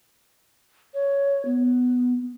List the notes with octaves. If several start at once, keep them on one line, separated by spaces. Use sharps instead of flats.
C#5
B3